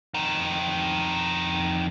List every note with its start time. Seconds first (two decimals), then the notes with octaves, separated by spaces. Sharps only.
0.14 F2 D#3